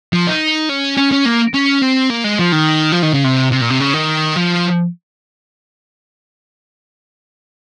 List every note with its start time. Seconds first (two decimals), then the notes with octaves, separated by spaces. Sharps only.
0.13 F3
0.27 D#4
0.69 C#4
0.97 C#4
1.12 C#4
1.25 A#3
1.54 C#4
1.82 C4
2.10 A#3
2.24 G#3
2.39 F3
2.52 D#3
2.92 F3
3.02 D#3
3.13 C#3
3.24 C3
3.52 C3
3.61 A#2
3.70 C3
3.80 C#3
3.94 D#3
4.36 F3